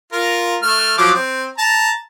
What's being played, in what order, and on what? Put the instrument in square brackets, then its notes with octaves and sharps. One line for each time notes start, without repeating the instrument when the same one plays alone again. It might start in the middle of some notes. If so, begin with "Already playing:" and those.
[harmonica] F4 A#4
A3 F6
F3 F#3 D6
C4
A5 A#5